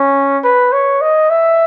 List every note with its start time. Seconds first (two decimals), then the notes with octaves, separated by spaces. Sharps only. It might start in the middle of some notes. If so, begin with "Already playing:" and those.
Already playing: C#4
0.44 B4
0.73 C#5
1.01 D#5
1.30 E5